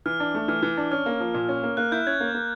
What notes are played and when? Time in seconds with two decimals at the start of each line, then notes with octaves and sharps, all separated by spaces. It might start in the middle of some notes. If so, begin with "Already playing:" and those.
0.06 E3 F6
0.20 D4
0.35 A3
0.48 E3 F6
0.62 E3
0.77 D4
0.91 C#4 F6
1.06 A#3
1.20 F3
1.34 A#2
1.48 C#4
1.63 A#3
1.77 A#3 F#6
1.92 E4 G6
2.06 C#4 G#6
2.20 A#3
2.34 A#3